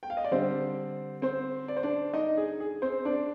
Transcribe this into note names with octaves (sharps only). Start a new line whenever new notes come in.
G5
F5
D#5
D5
D3 G3 C4 C5
C4 C5
D5
C5
D4 D5
D#4 D#5
G#4
G#4
C4 C5
D4 D5